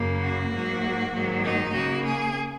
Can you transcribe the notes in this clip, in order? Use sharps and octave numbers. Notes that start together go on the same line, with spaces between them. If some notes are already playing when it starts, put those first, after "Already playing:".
Already playing: F#2 C#3 A#3
F#4
G#2 F#3 A#3
G#2 D#3 F#3 A#3
D#4
C#3 A#3 F#4
G#4